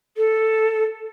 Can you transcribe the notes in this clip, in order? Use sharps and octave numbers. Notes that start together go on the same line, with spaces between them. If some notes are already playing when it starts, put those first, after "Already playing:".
A4